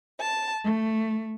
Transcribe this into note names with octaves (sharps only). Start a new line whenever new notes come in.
A5
A3